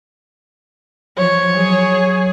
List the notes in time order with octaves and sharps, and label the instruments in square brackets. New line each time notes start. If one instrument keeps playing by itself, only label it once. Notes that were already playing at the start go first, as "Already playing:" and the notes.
[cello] F3 [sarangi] C#5
[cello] F#3 G#4